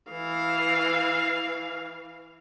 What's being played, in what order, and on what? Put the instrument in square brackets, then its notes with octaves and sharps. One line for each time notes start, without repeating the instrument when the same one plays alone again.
[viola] E3 F5